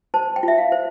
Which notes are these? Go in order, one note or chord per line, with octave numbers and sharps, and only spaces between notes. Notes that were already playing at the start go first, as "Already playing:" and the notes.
C5 A5
G5
F4 E5
F5
C5